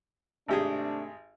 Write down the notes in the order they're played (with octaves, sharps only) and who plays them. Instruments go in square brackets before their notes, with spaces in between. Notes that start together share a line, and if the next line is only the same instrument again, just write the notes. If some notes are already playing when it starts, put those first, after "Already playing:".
[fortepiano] G#1 G4 G#4 [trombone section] C3 A3 D4